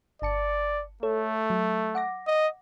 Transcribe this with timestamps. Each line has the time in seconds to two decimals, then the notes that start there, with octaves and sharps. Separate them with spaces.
0.22 G1 D5 A5 C#7
1.03 A3 A4 C#5
1.50 F#3
1.95 F#5 D6 A#6
2.27 D#5